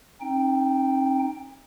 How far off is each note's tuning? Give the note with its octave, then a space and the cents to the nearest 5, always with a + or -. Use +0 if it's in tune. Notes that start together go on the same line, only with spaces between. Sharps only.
C4 +45 D#4 +0 G5 +0